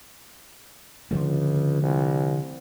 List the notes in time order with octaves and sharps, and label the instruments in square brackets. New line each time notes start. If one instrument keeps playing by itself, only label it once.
[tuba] C#2 [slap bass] D3 F3 A3
[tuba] C2